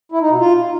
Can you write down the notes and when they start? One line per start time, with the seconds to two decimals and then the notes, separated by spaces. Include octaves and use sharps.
0.12 E4
0.21 D#4
0.30 B2
0.39 F4